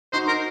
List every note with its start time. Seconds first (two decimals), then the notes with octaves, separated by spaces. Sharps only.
0.13 D#4 F#4 C5
0.28 A#4